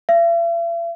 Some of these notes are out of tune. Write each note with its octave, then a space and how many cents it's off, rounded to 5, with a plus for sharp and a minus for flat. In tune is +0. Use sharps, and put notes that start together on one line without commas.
E5 +45